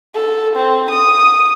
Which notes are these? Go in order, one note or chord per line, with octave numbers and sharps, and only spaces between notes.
A4
C4
D#6